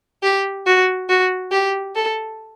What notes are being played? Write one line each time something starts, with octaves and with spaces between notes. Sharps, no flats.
G4
F#4
F#4
G4
A4